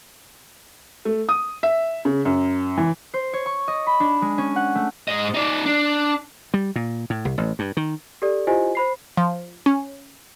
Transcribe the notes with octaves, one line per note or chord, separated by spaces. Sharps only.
A3
D#6
E5
C#3
F#2
E3
C5
C#5
C#6
D#5
B5
D4
G#3
C#4
F#5
A3
G#2 D#5
D#4 D5
D4
G3
A#2
A2
C2
A1
G2
D#3
G4 A4 D5
E4 F4 G4 C5 D#5 G#5
C5 B5 C7
F3
C#4